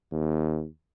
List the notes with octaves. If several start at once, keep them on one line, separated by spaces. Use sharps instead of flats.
D#2